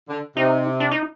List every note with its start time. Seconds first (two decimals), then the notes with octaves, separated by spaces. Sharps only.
0.09 D3
0.37 C3 D#4
0.80 D4
0.91 D#4